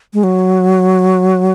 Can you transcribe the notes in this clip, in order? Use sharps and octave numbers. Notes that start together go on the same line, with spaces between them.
G#3
F#3